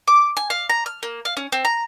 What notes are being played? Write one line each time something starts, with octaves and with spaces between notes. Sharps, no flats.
D6
G#5
F5
A#5
F6
A#3
F5
C#4
C4
A#5